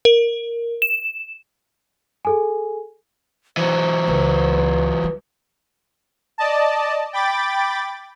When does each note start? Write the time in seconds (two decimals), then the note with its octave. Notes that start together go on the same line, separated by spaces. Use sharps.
0.05 A#4
0.82 E7
2.25 G#4 A4 G#5
3.57 E3 F#3 C5
4.08 C#2 B4
5.04 G3
6.38 D5 D#5 A5
7.13 G5 B5 D6 A6